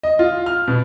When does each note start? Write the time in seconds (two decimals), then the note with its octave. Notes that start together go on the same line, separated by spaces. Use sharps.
0.03 D#5
0.19 F4
0.46 F6
0.68 B2